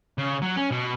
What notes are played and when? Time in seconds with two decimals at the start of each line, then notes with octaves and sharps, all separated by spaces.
0.18 C#3
0.42 F#3
0.57 C#4
0.71 B2